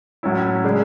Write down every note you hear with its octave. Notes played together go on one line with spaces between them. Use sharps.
A2 F#3 C#4 E4
C#3 G#3 D4